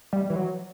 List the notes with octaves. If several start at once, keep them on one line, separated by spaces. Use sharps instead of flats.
G3
E3
F#3